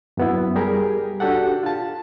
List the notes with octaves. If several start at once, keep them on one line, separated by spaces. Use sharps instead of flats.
F#2 B3 E4
G3 G4 G#4 A#4
D4 F#4 G4 A4 F#5
F4 A5